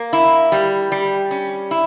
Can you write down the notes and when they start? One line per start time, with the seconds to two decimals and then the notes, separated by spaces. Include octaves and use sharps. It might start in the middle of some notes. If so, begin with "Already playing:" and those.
Already playing: A#3
0.13 E4
0.52 G3
0.92 G3
1.31 C#4
1.71 E4